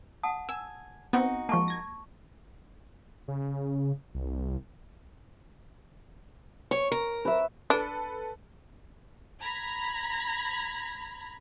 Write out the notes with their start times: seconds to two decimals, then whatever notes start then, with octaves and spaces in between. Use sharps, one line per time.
0.23 F#5 A5 D#6
0.49 G#5 E6
1.13 B3 C4 D#4 F#4
1.49 F3 G#3 A#3 A5 C#6
1.68 G#6 A#6
3.28 C#3
4.15 C2
6.71 C#5 C#6
6.92 A#4
7.25 B4 E5
7.70 D4 A4 B4
9.40 A#5 B5 G#6